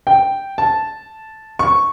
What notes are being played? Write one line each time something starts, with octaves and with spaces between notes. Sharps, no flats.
G5
A5
C#6